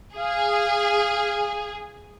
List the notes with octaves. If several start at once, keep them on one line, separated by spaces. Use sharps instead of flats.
G#4 F5